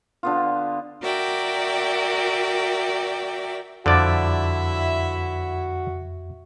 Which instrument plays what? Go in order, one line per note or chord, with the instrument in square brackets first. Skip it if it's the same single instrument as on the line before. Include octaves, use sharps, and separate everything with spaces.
[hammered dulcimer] D3 B3 F4
[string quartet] F#4 A#4 D5 E5 G5
[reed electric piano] F2 A6 [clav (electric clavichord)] D3 F3 D5 [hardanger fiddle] E4 E5 [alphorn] F#4